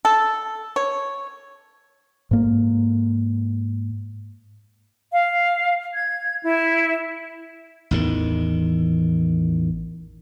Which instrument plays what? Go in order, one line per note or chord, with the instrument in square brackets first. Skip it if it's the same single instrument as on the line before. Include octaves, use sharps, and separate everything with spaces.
[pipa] A4
C#5
[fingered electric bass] G#2 A#3
[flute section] F5
G#6
E4
[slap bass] A1 E2 D#3